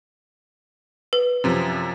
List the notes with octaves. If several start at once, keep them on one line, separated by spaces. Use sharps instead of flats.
B4
F#2 C3 F3